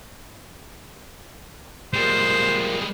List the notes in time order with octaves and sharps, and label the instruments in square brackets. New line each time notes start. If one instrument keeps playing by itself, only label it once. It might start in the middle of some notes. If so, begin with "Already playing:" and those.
[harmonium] A#2 [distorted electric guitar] G3 G#3 [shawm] C5